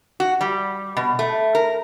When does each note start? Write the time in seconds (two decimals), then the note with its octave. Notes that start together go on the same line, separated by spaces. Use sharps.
0.20 F#4
0.41 G3
0.97 B2
1.19 A3
1.55 A#4